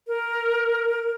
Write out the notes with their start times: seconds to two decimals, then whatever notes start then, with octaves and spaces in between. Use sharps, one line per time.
0.07 A#4